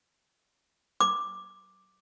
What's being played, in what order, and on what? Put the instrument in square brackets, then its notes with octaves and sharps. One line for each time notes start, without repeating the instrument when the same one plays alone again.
[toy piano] D6